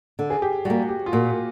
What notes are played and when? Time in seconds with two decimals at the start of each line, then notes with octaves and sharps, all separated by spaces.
0.19 D3
0.30 G#4
0.42 G4
0.65 G3 F#4
0.70 A#3
0.89 G4
1.06 F4
1.12 A#2 F#4